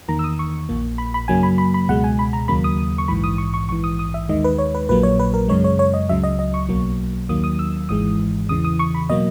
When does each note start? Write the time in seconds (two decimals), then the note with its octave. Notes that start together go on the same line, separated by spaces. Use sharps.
0.08 E2 D#3 A#3 A#5
0.19 E6
0.24 D#6
0.39 C#6
0.69 A#1 A#2 A#3
0.98 B5
1.14 B5
1.28 F#2 C#3 F#3 A#3 G#5
1.43 B5
1.58 B5
1.74 B5
1.88 C#2 B2 G#3 F#5
2.04 G#5
2.19 B5
2.33 A#5
2.48 D#2 C#3 F#3 A#3 B5
2.64 D#6
2.98 C#6
3.08 A#1 G#2 E3 B5
3.24 D#6
3.38 C#6
3.54 C#6
3.68 A#1 G#2 E3 C#6
3.84 D#6
3.99 D#6
4.14 E5
4.29 D#2 D#3 G#3 D#5
4.44 B4
4.59 C#5
4.75 B4
4.89 A#1 A#2 F#3 A#3 B4
5.03 C#5
5.19 B4
5.34 A#4
5.48 F#2 C#3 G#3 C#5
5.64 C#5
5.79 C#5
5.94 D#5
6.09 C#2 C#3 F#3 E5
6.24 D#5
6.39 D#5
6.54 C#6
6.68 B1 B2 F#3 A#3
7.29 D#2 D#3 F#3 A#3 D#6
7.44 D#6
7.59 E6
7.89 G#1 G#2 E3 G#3 D#6
8.49 E2 C#3 E3 D#6
8.65 D#6
8.79 C#6
8.95 B5
9.10 B2 F#3 A#3 D#5